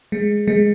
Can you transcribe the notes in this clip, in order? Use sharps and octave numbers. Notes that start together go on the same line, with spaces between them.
G#3
G#3